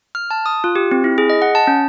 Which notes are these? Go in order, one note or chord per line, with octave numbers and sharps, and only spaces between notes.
F6
A5
D#6
F4
G4
C4
E4
G#4
D#5
F#5
A5
C#4